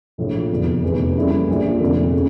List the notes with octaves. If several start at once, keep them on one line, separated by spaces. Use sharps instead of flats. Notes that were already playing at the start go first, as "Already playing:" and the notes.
A#1 A2 F3
F1 E2 D3
F1 E2 E3 A3
C#3 G3 A#3 E4 A4
A#1 A#2 F3
F1 F2 D3 A3
C#3